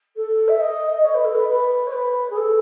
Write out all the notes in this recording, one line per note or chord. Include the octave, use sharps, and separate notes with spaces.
A4
E5
D#5
C#5
B4
A4
B4
B4
C#5
B4
G#4
A4